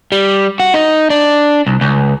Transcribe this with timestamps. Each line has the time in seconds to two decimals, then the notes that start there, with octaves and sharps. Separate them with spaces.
0.12 G3
0.60 F#4
0.74 D#4
1.10 D4
1.67 C2
1.81 C#2